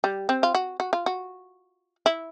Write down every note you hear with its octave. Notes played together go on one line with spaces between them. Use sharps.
G3
C4
F4
F#4
F#4
F4
F#4
E4